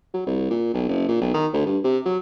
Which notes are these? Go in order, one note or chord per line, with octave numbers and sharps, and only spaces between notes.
F#3
C2
A#2
B1
F#1
A#2
B1
D#3
D2
G2
C3
F#3